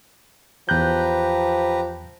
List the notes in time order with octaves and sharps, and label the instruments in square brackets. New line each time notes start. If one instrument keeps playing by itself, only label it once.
[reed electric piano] E2 F#6 G6 [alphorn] F3 [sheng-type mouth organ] G4 B4 A#5